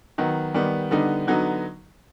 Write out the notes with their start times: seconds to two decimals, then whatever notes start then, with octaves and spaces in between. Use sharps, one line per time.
0.18 D#3 F#3 B3
0.54 D#3 G3 B3
0.91 D3 G3 B3 D#4
1.27 D3 F#3 B3 D#4